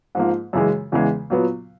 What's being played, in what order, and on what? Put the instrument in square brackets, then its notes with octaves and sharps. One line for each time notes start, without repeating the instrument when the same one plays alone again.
[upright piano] G#2 F3 A#3
F#2 C#3 E3 G#3
E2 C#3 E3 G#3
A#2 F#3 B3